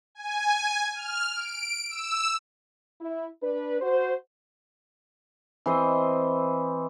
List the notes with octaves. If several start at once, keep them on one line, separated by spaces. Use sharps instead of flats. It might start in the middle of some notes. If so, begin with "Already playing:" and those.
G#5
F6
D7
E6
E4
D4 B4
F#4 C5
E3 C4 C5 D#5